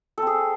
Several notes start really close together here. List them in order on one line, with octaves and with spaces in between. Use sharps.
A4 C4 G#4